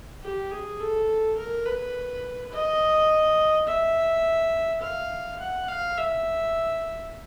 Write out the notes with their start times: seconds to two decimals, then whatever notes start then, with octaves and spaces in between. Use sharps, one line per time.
0.23 G4
0.51 G#4
0.80 A4
1.37 A#4
1.66 B4
2.52 D#5
3.68 E5
4.82 F5
5.40 F#5
5.69 F5
5.98 E5